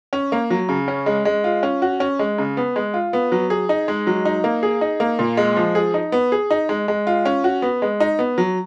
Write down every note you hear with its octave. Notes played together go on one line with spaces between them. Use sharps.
C#4
A#3
F#3
C#3
C#4
G#3
G#3
F4
C#4
F#4
C#4
G#3
C#3
B3
G#3
F4
B3
F#3
G#4
D#4
G#3
F#3
D#4
A#3
G#4
D#4
A#3
A#2
G#3
F3
G#4
D#4
B3
G#4
D#4
G#3
G#3
F4
C#4
F#4
B3
G#3
D#4
B3
F#3